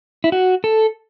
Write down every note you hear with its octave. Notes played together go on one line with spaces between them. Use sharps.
E4
F#4
A4